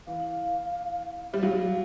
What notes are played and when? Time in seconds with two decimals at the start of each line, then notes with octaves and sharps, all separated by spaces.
0.07 E3 F5
1.32 G3 E5
1.42 F#3 F5